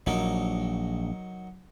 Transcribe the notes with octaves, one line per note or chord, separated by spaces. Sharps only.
A#1 F#3 D#4 A#4